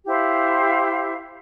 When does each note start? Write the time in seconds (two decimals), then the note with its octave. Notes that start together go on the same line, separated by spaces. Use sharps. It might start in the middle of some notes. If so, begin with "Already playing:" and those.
0.06 E4 G4 C5 F5